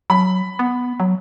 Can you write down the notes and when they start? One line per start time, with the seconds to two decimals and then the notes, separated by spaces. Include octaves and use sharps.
0.10 F#3 B5
0.59 B3
1.00 F#3